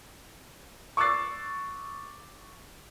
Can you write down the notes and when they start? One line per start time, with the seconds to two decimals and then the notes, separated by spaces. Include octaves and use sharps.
0.97 C#6 D6 E6 F#6 A6 C7